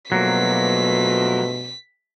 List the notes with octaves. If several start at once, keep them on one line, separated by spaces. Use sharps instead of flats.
G2 B2 F3 F#3 A3 A#3 B6